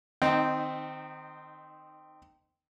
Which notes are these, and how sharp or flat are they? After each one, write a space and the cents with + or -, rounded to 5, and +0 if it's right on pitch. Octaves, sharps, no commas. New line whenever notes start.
D#3 -25 C4 -10 D#4 +0